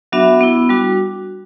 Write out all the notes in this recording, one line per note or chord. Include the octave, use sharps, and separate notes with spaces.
F#3 B3 D4 F#4 E5
B3 E4
G3 D4 F#4